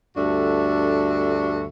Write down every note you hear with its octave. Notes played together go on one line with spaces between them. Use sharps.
D2 G2 D4 F#4 A4 E5